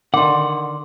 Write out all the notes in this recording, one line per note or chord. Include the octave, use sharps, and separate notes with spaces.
D3 D#3 F#5 C6 D6